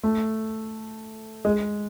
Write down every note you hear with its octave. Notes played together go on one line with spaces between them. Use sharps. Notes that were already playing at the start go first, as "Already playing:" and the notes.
A3
G#3